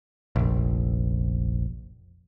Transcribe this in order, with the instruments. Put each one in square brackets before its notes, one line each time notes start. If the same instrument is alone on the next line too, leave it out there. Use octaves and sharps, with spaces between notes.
[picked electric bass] F1 A#1